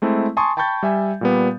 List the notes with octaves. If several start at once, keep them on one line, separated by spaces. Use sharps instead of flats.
G#3 A3 C4 E4
G#5 A5 C6 C#6 D#6
G5 A5 B5 C#6 G6 A6
G3 E5 G#5
A#2 G3 B3